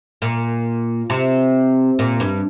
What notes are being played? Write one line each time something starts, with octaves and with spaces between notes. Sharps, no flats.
A#2
C3
A#2
G2